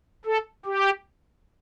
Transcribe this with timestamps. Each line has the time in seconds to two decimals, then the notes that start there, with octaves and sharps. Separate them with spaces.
0.25 A4
0.66 G4